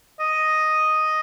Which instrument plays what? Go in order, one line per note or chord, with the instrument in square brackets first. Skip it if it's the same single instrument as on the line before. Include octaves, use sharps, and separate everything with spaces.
[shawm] D#5